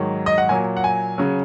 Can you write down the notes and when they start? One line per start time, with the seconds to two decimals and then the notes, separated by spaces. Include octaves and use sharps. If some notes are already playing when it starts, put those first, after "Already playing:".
Already playing: G#2 D#3 F#3
0.26 D#5
0.38 F#5
0.49 A#2 F#3 G#5
0.77 F#5
0.84 G#5
1.18 C#3 F#3